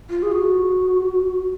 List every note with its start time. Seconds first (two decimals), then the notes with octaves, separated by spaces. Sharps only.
0.10 F4
0.23 G#4
0.32 F#4